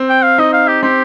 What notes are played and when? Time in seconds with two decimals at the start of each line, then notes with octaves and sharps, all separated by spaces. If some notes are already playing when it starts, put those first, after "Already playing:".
Already playing: C4
0.09 G5
0.23 F5
0.38 D#4 D#5
0.53 F5
0.68 G4
0.83 C4 G4